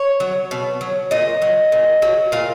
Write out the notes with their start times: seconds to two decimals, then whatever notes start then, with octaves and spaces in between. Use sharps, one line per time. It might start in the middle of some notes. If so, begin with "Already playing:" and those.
Already playing: C#5
0.20 F#3
0.51 B2
0.81 F#3
1.11 A#2 D#5
1.42 F#3
1.72 A#2
2.02 F#3
2.32 A#2 F5